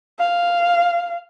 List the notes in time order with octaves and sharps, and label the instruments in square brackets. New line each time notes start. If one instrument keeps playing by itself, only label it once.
[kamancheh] F5